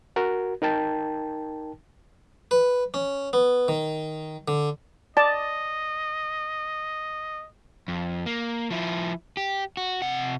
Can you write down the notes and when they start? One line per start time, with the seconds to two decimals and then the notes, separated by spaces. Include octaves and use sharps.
0.16 F#4 A#4
0.62 D#4 A#4 G5 A5
2.51 B4
2.94 C#4
3.33 B3
3.68 D#3
4.48 D3
5.17 D5 D#5 A5
7.88 F2
8.26 A#3
8.71 F3 E4
9.37 G4
9.77 F#4
10.02 C3 F#5